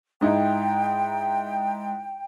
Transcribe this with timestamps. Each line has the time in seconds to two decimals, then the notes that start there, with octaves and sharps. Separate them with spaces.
0.21 G#2 D#4 E4 G5